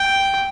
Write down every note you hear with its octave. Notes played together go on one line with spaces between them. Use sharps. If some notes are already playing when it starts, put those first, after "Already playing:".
Already playing: G5